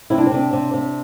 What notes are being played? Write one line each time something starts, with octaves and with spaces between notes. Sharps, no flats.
C3 E4
D4
C4
C3 D4
C3
C3